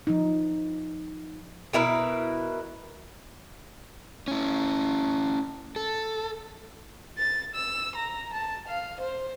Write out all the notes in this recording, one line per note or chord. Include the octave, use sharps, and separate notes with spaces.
F3 D#4
B2 E4 A#4 B4
C#4 E4
A4
A6
E6
A#5
A5
F5
C5